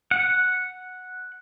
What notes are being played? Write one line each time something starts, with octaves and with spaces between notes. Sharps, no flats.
F#5